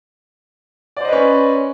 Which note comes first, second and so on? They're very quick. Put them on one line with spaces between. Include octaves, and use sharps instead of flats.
D5 C5 D#5 B4 C#4